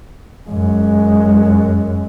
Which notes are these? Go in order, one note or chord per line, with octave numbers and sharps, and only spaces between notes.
F#2 G#3